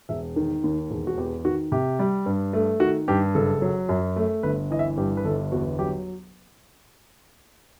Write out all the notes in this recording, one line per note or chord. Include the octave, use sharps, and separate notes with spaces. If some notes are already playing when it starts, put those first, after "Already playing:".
E1 E5
D#3
D#2
E1
F#4
E2 G4
D#3 F#4
C3 G4
G3
G2
A3
D#3 F#4
G2 G4
F#1 A4
F#3
F#2
A3
G1 B4
E3 D#5
E5
G2 G4
B4
G1 A4
E2 F#4
F#3 G4